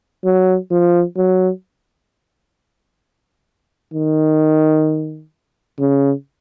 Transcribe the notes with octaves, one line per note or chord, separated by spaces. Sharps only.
F#3
F3
F#3
D#3
C#3